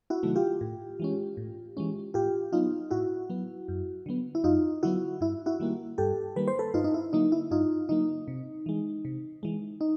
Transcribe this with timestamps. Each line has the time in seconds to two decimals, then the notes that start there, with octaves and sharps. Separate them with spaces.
0.10 E4 F#4
0.23 C3 D#3 F#3 A3
0.36 F4 G4
0.61 A2
1.00 E3 G#3 C#4
1.37 A2
1.77 E3 G#3 C#4
2.14 A2 F4 G4
2.53 F#3 B3 D#4 F4
2.91 A2 E4 F#4
3.30 F#3 B3
3.68 F#2
4.06 D3 F#3 B3
4.35 E4
4.44 F#2 D#4 F4
4.83 D3 F#3 B3 E4 F#4
5.21 G2 E4
5.46 E4 F#4
5.60 D#3 G3 A#3
5.98 G2 G4 A4
6.36 D#3 G3 A#3 B4
6.48 C5
6.59 A4 B4
6.74 G2 D#4 F4
6.84 D#4
6.94 E4
7.13 D3 F#3 A#3 D#4
7.32 E4
7.51 G2 D#4 F4
7.89 D3 F#3 A#3 D#4
8.28 C3
8.66 E3 G#3
9.05 C3
9.43 E3 G#3
9.81 D#4